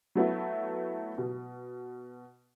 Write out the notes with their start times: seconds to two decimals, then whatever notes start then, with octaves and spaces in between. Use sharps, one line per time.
0.15 F#3 A3 B3 E4
1.18 B2